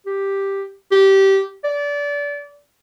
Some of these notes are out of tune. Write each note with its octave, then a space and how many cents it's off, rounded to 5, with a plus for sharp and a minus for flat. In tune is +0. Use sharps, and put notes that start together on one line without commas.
G4 +5
G4 -15
D5 -25